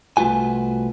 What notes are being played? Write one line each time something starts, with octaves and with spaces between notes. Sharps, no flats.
C2 A3 B3 F4 F#4 G#5